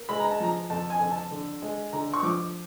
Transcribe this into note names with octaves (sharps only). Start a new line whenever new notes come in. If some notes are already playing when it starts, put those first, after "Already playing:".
Already playing: A#3
G#3 B5
A#5
A5
F3 A#5
F2 A5
G#5
F2
A5
D3
G#3
D3 A#5
C#6
F3 D6